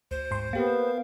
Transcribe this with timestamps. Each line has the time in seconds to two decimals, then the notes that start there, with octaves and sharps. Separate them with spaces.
0.11 D2 C5
0.31 G#2 C6
0.53 A#3 B3 G4 A#4 F5